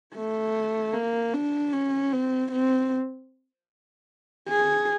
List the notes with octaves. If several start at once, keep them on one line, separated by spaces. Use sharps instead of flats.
A3
A#3
D4
C#4
C4
C4
G#4